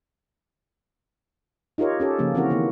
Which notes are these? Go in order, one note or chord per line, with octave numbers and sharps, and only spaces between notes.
D#4 F4 G4 A#4 C#5
C#4 G4 A4
C#3 F3 A#3 C#4
E3 C4 C#4 F#4 A#4
D#3 E3 A#3 B3